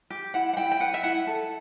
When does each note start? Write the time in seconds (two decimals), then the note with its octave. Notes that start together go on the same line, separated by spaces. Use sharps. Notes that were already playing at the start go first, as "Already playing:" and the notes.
0.10 G4
0.34 E4 F#5
0.53 F#5
0.57 E4 G5
0.72 G5
0.80 B4 F#5
0.94 E5
1.03 E4 F#5
1.27 A4